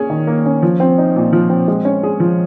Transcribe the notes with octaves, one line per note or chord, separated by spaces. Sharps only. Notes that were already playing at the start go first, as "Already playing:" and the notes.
Already playing: A#3 C#4 G#4
D#3
A#3
C#4
F3
C4
D#4
A#2
F3
C4
G#3
C#4
G#4
F3